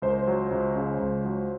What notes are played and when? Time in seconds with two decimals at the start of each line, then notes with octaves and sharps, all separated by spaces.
0.02 C#2 C5
0.10 A#4
0.19 C5
0.27 F#3
0.51 C#2
0.76 C#3
0.99 C#2
1.25 F#3